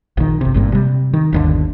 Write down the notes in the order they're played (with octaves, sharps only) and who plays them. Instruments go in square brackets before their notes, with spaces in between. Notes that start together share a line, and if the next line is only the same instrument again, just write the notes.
[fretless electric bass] A#1 D#3
G1 C3
G1 G2 A#2
C3 G3
D#3
G1 D#2 D3